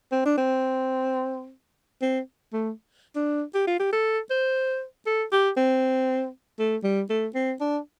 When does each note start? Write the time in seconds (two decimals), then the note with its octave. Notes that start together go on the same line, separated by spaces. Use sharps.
0.12 C4
0.25 D4
0.37 C4
2.02 C4
2.53 A3
3.16 D4
3.54 G4
3.67 F4
3.79 G4
3.92 A4
4.30 C5
5.06 A4
5.32 G4
5.57 C4
6.59 A3
6.84 G3
7.10 A3
7.34 C4
7.60 D4